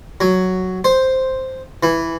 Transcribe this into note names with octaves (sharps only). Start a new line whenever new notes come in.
F#3
C5
E3